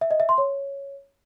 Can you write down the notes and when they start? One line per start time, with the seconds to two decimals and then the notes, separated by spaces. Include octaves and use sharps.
0.01 E5
0.11 D#5
0.20 E5
0.29 C6
0.38 C#5